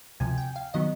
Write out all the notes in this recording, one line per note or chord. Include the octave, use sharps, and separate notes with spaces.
D2 C3 F3 G#5
G5
F5
D#3 F#3 B3 D#5